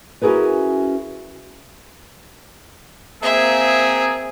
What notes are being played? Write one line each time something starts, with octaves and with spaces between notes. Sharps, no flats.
C#4 E4 F#4 G#4 A#4 B4
A#3 C4 G#4 E5